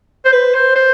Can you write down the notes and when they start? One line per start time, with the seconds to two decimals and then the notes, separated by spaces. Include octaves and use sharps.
0.25 C5
0.32 B4
0.54 C5
0.76 C5